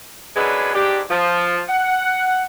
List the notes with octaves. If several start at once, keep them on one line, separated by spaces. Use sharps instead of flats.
F#2 F#3 G#3 D4 B4
G#2 D4 G4
F3
F#5